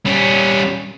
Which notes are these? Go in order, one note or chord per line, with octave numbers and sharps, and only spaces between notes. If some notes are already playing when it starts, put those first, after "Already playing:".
G3 C#4